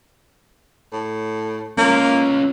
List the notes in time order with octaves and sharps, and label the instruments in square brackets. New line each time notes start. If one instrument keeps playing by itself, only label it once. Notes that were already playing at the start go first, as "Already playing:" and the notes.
[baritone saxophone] A2
[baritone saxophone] A#3 [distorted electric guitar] C#4 F4